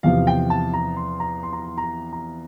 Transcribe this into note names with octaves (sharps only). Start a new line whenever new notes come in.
E2 C3 F3 F5
G5
A5
A#5
C6
A#5
C6
A#5
C6
A#5
A#5